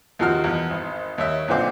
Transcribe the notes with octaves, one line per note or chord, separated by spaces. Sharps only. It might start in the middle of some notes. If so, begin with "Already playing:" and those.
D#2 C3 F3 F#4 F6
E2 B2
G#1
D#2 C#5 E5
B1 A#2 D3 C4 D6